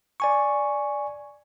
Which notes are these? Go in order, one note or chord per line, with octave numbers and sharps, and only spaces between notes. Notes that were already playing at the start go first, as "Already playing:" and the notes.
D5 G#5 C#6